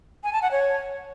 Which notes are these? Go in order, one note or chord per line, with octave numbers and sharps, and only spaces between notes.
G#5
A5
F#5
C#5